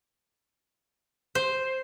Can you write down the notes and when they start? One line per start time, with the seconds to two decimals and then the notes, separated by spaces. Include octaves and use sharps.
1.35 C5